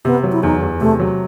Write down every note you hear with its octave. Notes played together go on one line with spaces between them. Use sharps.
C3 B3
F#3
E4
E2 D#4
E2
C3 A3
F#3